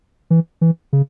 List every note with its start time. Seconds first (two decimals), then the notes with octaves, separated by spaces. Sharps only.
0.30 E3
0.61 E3
0.93 C#3